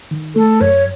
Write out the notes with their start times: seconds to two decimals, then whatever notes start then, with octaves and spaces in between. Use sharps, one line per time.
0.11 D#3
0.35 A3 A4
0.61 F#2 C#5